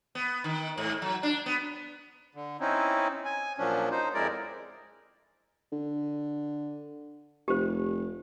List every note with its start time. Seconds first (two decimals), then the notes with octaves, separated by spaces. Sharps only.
0.15 B3
0.44 D#3
0.78 G#2
1.02 F#3
1.23 D4
1.46 B3
2.35 D3
2.61 C4 C#4 D#4 E4
3.25 G#5
3.58 A#2 F3 F#3 C#4 D4
3.91 D#4 C5
4.14 F2 G#3 E4 A#4 D5
5.72 D3
7.48 F1 G4 C5